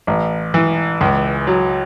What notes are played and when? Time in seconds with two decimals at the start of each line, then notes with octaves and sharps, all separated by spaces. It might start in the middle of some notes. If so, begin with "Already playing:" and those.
0.07 A1
0.54 E3
1.01 C#2
1.47 F#3